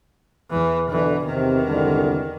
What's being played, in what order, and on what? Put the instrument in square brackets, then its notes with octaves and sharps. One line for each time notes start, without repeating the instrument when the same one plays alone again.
[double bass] E2 E3
[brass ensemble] B2 D3 [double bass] E3
[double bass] E2 D#3 [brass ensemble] C3
[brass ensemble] C2 G#2 D3